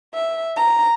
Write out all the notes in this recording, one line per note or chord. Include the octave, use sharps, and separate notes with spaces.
E5
A#5